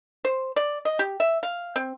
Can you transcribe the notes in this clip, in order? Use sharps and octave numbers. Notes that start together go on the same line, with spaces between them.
C5
D5
D#5
G4
E5
F5
C4